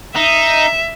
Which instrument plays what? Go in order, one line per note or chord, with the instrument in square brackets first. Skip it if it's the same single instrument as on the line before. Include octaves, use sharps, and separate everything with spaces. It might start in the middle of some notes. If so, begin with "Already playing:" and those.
[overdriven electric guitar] D#4 [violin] E5